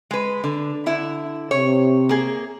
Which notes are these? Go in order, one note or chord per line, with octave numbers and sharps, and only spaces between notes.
G#3 B4
D3
D3 E4
C3 C#5
A#3 G#4